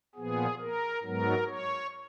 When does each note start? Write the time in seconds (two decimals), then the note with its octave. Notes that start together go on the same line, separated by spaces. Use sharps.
0.15 A#2 F3 B3 G#4
0.60 A#4
1.03 G#2 F#3 B3 A#4
1.47 C#5